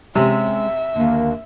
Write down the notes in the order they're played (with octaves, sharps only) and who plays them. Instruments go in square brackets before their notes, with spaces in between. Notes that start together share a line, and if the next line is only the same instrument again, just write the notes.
[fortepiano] C3 [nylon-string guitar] G#3 C4 C#4 [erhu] E5
[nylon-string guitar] D#2 D3 [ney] A#3